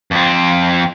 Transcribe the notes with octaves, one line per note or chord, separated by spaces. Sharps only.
F2 C4